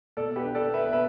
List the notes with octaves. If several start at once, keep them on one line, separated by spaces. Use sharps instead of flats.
B2 A4 D5
G4 B4
D4
A4 D5
B3
B4 E5
B2 B4 E5